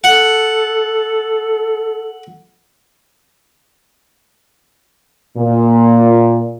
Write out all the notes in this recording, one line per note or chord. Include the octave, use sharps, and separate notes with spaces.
A4 F#5
A#2